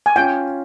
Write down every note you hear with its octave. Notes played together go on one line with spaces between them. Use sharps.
G#5
C#4 F4 G5